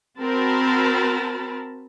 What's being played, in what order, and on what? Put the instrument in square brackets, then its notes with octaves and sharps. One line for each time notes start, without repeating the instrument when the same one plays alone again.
[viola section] C4 F#4 A#4 A5 B5